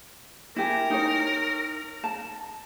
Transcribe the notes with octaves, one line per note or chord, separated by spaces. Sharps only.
E4 G4 A#4 G#5
D#4 C#5
A5